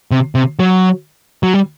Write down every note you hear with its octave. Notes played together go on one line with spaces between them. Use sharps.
C3
C3
F#3
F#3
G3